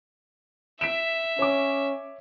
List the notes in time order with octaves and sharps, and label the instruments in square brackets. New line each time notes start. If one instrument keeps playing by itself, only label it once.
[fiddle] E5 [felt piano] B6 D7 E7
[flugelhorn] C#4 [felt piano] C#5 D6